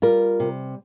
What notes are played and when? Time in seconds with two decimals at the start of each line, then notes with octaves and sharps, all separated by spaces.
0.02 G3 F4 A#4
0.40 C3